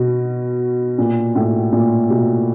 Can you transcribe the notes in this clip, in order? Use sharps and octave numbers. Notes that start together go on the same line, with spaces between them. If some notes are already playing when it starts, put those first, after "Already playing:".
Already playing: B2
A#2
A2
A#2
B2